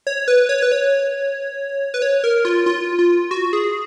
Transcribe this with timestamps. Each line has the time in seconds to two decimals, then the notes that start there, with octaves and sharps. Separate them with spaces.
0.07 C#5
0.28 B4
0.49 C#5
0.62 B4
0.72 C#5
1.94 B4
2.02 C#5
2.24 A#4
2.45 F4
2.66 F4
2.99 F4
3.31 F#4
3.53 G#4